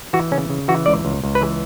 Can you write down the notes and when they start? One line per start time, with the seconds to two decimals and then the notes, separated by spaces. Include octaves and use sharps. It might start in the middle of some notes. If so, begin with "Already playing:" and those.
0.13 E3 F#4
0.31 C#3 C#4
0.50 C#3
0.68 E3 F#4
0.86 C#2 D5
1.05 C#2
1.24 C#2
1.35 B4
1.41 E3